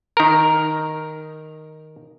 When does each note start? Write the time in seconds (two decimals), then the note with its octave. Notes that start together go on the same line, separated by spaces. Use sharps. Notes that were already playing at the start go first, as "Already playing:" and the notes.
0.17 D#3 A#4